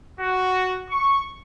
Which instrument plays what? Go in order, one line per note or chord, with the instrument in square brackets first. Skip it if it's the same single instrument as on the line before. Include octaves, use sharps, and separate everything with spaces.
[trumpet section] F#4
C#6